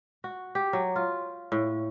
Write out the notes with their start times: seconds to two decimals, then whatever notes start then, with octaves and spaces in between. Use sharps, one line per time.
0.24 F#4
0.55 G4
0.73 F#3
0.96 F4
1.52 A2